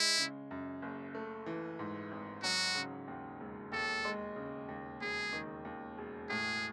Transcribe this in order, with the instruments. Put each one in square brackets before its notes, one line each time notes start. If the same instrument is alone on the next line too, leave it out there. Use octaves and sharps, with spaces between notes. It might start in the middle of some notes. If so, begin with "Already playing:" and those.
Already playing: [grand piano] G#3 [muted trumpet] E4
[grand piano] C#3
F#2
F#1
A3
E3
G#2
G#1
[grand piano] F#3 [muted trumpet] F#4
[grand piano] C#3
D#2
E1
[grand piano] D#2 [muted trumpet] A4
[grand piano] G#3
C#3
D#2
[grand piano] E1 [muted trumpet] G#4
[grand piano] D#3
D#2
E1
[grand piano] A2 [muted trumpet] G#4